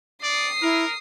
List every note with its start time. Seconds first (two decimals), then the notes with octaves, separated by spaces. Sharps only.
0.23 D5 D#6 C7
0.62 E4 A#4